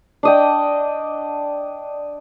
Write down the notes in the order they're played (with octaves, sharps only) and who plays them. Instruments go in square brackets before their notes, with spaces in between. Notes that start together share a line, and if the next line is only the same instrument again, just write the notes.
[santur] D4 D#5 G5